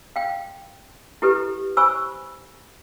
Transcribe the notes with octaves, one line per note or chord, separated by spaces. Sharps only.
F5 G5
E4 G4 A4 B4
C5 G#5 B5 C#6 E6